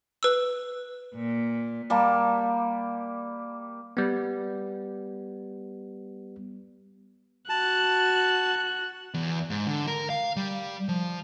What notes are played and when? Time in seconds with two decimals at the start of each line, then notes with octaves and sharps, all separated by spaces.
0.23 B4 E6
1.16 A#2
1.90 G3 A#3 A5
3.97 G3 B3
7.49 F#4 A5 F#6
9.14 E2
9.50 G#2
9.67 D3
9.87 A#4
10.10 F5
10.36 G3
10.89 F3